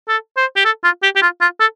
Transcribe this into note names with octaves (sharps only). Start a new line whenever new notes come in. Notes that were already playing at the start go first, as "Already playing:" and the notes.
A4
C5
G4
A4
F4
G4
G4
F4
F4
A4